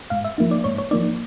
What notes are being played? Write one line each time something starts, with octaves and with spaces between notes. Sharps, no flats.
G#2 F5
E5
F3 A#3 D#4
D5
G#2 C#5
C#5
F3 A#3 D#4 D5